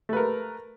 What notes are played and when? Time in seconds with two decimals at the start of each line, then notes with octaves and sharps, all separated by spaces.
0.09 A3
0.13 B4
0.17 A#4